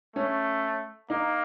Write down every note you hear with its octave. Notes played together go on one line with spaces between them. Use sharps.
A3 C#4
A#3 D#4